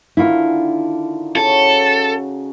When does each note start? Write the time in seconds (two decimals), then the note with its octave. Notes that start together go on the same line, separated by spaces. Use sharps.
0.17 D3 D#3 E4 F4
1.36 C#3 D#4 F#4 A4